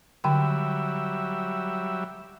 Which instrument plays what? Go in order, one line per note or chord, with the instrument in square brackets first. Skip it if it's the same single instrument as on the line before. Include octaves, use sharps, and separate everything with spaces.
[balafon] D3 G5 C6 [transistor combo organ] F#3 G3 E5